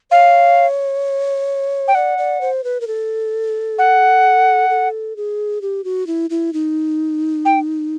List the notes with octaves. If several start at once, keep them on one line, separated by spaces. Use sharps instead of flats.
C#5 F5
G5
D5 F#5
D5
C5
B4
A#4
A4
F#5
A4
G#4
G4
F#4
E4
E4
D#4
G5